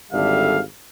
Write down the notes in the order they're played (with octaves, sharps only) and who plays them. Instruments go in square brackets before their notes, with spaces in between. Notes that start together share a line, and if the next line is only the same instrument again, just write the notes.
[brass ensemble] G#1 D3 G3 A4 E5 F5